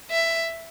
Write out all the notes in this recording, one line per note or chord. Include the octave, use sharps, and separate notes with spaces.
E5